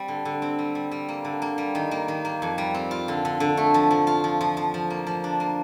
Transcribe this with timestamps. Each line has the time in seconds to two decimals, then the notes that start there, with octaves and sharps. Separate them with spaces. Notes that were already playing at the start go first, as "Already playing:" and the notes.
Already playing: G3 C4
0.08 D3
0.25 D3
0.42 C4
0.59 G3
0.75 G3
0.91 G3
1.09 A#3
1.25 D3
1.42 A#3
1.58 G3
1.75 D#3
1.91 A#3
2.08 D#3
2.25 A#3
2.42 F2
2.58 G3
2.74 C4
2.91 F4
3.08 D3
3.25 D3
3.40 D3
3.57 A3
3.74 F3
3.91 F3
4.07 F4
4.24 F3
4.41 F3
4.57 F3
4.74 F3
4.90 A#3
5.07 F3
5.24 D4
5.40 A#3